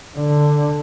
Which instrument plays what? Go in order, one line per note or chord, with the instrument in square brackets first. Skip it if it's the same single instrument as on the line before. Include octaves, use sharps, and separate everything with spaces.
[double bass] D3